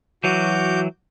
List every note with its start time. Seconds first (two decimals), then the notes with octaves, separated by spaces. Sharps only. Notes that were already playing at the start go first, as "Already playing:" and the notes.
0.24 E3 F#3 F#4 D6 G6